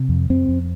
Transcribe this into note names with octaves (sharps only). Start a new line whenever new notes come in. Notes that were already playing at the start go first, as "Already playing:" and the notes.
Already playing: C3
F2
F2 C4
F2